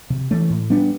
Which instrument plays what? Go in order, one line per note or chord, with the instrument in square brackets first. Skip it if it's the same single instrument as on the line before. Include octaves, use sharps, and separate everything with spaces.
[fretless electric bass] C3
E3 A3
A2
G3 B3 D4